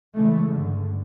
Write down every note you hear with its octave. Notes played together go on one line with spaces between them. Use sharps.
C#3 E3 G#3 A3
G2 D3